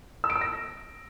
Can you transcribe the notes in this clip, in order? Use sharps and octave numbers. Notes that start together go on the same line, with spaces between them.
E6
D7
E6
A#6